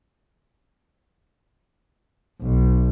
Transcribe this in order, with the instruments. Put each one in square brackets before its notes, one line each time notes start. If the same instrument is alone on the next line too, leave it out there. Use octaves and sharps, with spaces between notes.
[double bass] B1